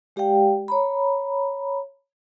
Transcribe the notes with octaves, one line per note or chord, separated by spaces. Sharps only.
G#3 G4 D5 F5 G5
C#5 A#5 B5